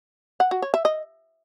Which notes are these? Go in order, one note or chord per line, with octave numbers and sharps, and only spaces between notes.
F#5
F#4
C#5
E5
D#5